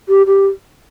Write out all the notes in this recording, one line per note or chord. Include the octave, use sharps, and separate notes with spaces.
G4
G4